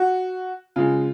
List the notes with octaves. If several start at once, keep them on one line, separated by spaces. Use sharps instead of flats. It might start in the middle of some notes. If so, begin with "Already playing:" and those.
Already playing: F#4
C#3 G#3 F4